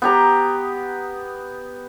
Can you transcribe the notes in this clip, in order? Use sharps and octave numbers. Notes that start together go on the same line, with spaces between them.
B3 G4 A#5